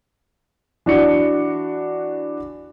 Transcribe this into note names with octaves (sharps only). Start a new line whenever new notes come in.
E3 D4 F#4 C#7